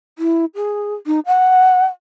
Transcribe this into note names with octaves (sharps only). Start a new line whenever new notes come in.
E4
G#4
D#4
F#5